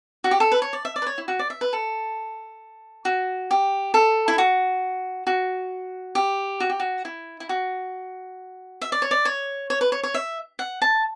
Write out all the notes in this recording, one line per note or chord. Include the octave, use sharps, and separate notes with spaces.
F#4
G4
A4
B4
C#5
D5
E5
D5
B4
C#5
E4
F#4
D5
E5
B4
A4
F#4
G4
A4
E4
F#4
F#4
G4
F#4
G4
F#4
E4
E4
F#4
E5
D5
C#5
D5
C#5
C#5
B4
C#5
C#5
E5
F#5
A5